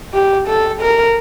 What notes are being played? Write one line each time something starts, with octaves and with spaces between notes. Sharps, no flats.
G4
A4
A#4